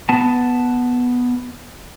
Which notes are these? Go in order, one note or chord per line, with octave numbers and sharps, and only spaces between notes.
B3 A5